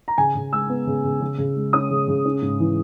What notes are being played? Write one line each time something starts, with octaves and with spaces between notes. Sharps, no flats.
A#5
C#3 G#5
C#3
G#3 E6
B3
C#3
C#3
C#3
C#3
G#3
C#4 D#6
C#3
C#3
C#4
G#2
E3